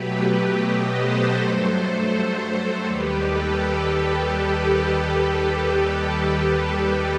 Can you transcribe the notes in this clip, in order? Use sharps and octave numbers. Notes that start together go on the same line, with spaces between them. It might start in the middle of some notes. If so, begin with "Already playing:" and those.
Already playing: B2 F#3 A3 G4 B4
B4 D#5
A4 C5
G2 F#3 A3
D#2 D#3 G3 G4 B4
A4
G4